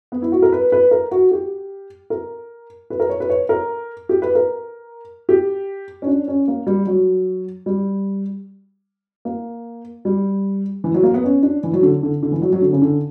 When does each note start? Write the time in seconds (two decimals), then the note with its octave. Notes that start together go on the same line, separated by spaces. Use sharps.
0.12 B3
0.22 E4
0.32 F#4
0.42 A#4
0.52 B4
0.72 B4
0.91 A#4
1.11 F#4
1.31 G4
2.10 A#4
2.90 B4
3.00 A#4
3.10 C#5
3.20 B4
3.29 C#5
3.49 A#4
4.09 G4
4.22 B4
4.35 A#4
5.29 G4
6.02 C#4
6.07 D4
6.28 C#4
6.48 A#3
6.67 G3
6.87 F#3
7.66 G3
9.25 A#3
10.05 G3
10.84 E3
10.94 F#3
11.03 A#3
11.14 B3
11.24 C#4
11.43 D4
11.64 E3
11.73 F#3
11.83 D3
12.03 D3
12.23 D3
12.32 E3
12.42 F#3
12.53 F#3
12.62 D3
12.73 C#3
12.82 D3